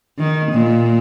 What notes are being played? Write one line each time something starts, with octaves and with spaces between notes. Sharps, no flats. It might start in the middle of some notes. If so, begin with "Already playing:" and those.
D#3
A#2